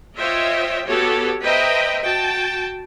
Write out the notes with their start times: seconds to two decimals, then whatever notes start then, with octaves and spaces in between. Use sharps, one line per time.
0.16 F4 C5 C#5 D#5 E5 G5
0.87 B3 F#4 G4 A4 C#5
1.42 B4 C5 D#5 E5 G5 A#5
2.01 F#4 G5 A5